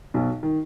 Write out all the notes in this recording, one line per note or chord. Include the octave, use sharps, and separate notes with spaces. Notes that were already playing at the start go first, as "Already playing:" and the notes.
B1 B2
D#3